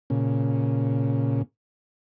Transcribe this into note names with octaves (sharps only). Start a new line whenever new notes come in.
A#2 C#3